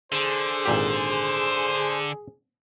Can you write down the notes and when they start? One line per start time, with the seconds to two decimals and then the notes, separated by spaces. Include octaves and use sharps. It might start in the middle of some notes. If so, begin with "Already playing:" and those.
0.12 D3 G#4 C5
0.66 G#1 A#2 G4